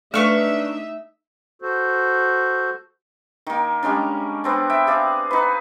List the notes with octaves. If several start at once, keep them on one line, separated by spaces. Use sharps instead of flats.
A3 D4 D#4 A4 B4 E5 C#6 F6
F#4 A4 C5
D#3 A#3
G3 G#3 C#4 D4
B3 C4 D4
E5 G5
G#4 D5 F5
D#4 B4